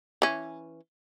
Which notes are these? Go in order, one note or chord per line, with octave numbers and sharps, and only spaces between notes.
E3 C#4